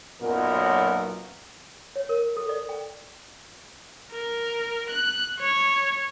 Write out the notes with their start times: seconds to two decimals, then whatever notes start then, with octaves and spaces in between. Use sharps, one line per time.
0.22 B1 F#2 A#2 F#3 B3 A#4
1.96 C#5
2.09 A#4
2.37 A4
2.49 D5
2.69 G5
4.12 A#4
4.90 F#6
5.40 C#5